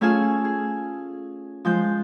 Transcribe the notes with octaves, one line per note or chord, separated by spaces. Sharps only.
A3 C#4 F4 G#4 G#5 E6
G#4
F3 G#3 G6